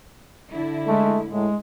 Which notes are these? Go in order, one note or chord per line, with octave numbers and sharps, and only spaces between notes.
D3 E4
G#3 A3
A2 G#3